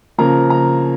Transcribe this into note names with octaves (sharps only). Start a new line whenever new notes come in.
C#3 F3 A#3 A#5
A#5